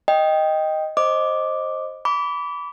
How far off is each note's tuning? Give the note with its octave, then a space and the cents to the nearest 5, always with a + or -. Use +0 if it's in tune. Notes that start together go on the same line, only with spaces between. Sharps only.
D#5 +0 G5 +0
C5 +20 D#5 +0 D6 +0
B5 +0 D6 -30